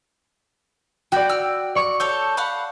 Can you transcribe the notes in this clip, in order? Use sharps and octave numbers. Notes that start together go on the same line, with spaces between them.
F#4 D5 G5 B5 G6
G5 E6 F6
D5 C#6 D6
A4 C#5 E6 G6
F5 F#5 B5